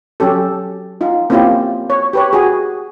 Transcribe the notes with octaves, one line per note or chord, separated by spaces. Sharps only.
F#3 C#4 G4 A4
D#4 F4
A#3 C4 C#4 E4 F4 G4
C#5
G4 B4 C#5
F#4 G#4